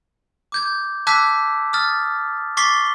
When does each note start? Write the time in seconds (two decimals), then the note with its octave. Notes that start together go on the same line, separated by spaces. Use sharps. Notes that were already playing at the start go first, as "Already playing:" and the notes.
0.52 D6 G6 G#6
1.07 A5 D6 E6 F#6 G#6 B6
1.73 D#6 F6 A6
2.57 C#6 D6 A6 B6 C7 G7